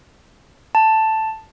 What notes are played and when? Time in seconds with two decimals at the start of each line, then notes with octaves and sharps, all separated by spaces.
0.75 A5